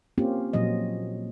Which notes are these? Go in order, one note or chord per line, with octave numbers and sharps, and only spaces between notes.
A#3 C4 C#4 F4 G4
A#2 F3 F#3 D#5